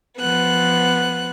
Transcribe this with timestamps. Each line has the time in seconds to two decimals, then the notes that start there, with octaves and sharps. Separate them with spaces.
0.19 F3 B3 F#6